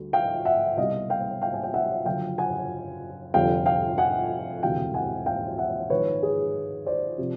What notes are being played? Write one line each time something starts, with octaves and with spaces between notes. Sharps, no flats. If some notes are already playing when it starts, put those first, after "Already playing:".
Already playing: D2 D3 G3
F5 G5
E5 F#5
C2 B2 G3 D#5 F5
F5 G5
F5 G5
G#5
G5
E5 F#5
F#1 F#2 D3 F3 F5 G5
F#5 G#5
F1 F2 D3 G3 F5 G5
F5 G5
F#5 G#5
E1 D2 C3 E3 F5 G5
F#5 G#5
F5 G5
E5 F#5
A#1 G#2 D#3 F#3 B4 C#5
G#4
C5 D5
C3 F3